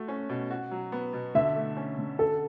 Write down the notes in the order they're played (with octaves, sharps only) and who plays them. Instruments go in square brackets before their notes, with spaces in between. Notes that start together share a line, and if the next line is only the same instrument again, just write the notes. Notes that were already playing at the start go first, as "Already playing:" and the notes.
Already playing: [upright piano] A3 F#4
C#4
B2
F#4
F#3
B3
B2
[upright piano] D3 [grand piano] E5
[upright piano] A3
C#4
D3
[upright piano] F#4 [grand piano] A4